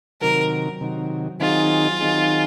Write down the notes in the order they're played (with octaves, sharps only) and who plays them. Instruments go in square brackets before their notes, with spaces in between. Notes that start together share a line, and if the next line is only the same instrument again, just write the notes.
[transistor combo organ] C3 D#3 F#3 [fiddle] A#4
[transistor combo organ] C3 D#3 F#3
[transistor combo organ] D#3 F#3 C4 D#4 G#4 [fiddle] F4
[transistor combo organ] D#3 F#3 C4 D#4 G#4